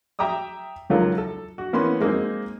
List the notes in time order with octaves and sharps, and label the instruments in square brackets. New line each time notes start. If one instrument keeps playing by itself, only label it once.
[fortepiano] E5 G5 A#5 D6 D#6
C#2 D#3 F#3 F4 A4 A#4
A4
F#4
E3 A#3 B3 C#4 C6
G#3 A#3 C4 D#4 G#4